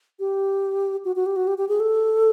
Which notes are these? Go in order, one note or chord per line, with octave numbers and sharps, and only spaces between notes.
G4
F#4
F#4
G4
F#4
G4
G4
G#4
A4